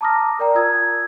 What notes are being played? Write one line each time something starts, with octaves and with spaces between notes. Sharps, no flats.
A5 A#5 D6 D#6 F6 A#6
A#4 D5 G5 A#5
F4 D#6 E6 G#6